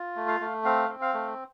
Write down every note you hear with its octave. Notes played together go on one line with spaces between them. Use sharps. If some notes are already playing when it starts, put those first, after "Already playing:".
Already playing: F4
A3
F5
A3
C4 F5
C4
F5
A3